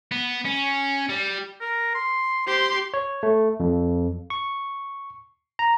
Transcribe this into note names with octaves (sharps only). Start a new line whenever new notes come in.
B3
C#4
G3
A#4
C6
G4 C5 C6
C#5
A3
F2
C#6
A#5